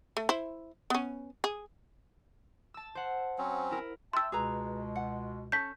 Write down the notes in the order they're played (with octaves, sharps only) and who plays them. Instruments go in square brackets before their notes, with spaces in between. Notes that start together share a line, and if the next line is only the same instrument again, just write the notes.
[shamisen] A3
E4 C5
B3 C#4
G#4
[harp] A5 E6
C5 F#5
[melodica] F#3 C4 C#4
[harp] E4 A#4
[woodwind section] E5 G5 A5 [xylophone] C6 E6
[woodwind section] C#2 B2 G#3 [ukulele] G#4 B4 A#5
[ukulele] F#5
[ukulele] C#4 A4 A5 [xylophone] G6 B6